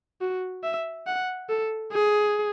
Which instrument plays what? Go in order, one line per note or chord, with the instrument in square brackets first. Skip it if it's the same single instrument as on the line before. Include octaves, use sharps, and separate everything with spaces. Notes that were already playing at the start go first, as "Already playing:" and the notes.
[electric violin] F#4
E5
F#5
A4
G#4